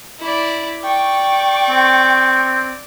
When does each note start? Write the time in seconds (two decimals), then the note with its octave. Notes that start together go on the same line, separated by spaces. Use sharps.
0.20 E4 D5
0.83 D5 G5 C#6
1.70 C4